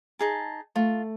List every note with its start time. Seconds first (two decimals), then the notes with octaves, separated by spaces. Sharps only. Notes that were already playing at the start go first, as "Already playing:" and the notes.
0.19 D#4 G#4 A5
0.76 A3 F4